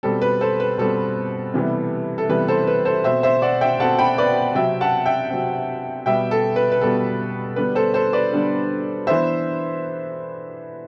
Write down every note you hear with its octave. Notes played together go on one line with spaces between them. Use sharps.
B2 G3 C4 A4
B4
A4 C5
B4
B2 G3 C4 A4
C3 E3 G3 B3
A4
C3 E3 G3 B3 B4
A4 C5
B4
A4 C5
B2 A3 C4 C5 E5
C5 E5
D5 F#5
E5 G5
B2 A3 C4 F#5 A5
G5 B5
B4 D5
C3 F#3 C4 E5 G5
F#5 A5
E5 G5
C3 F#3 C4
B2 G3 B3 E5 G5
A4
B4
B4
B2 G3 B3 A4
D3 G3 B3 D4 B4
A4 C5
A4 C5
B4 D5
D3 G3 B3 D4
E3 B3 D4 C5 E5